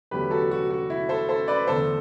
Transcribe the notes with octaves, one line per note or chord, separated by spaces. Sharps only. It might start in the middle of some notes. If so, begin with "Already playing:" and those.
E2 D3 F#3 A3 G4 B4
F#4 A4
F#4
F#4
E4
A4 C5
A4 C5
B4 D5
E2 D3 A3 A4 C5